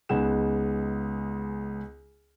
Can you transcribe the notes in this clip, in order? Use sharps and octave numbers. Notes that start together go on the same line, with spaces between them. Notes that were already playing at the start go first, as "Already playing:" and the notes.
C#2 B3 D#4 G#4 F#5 E7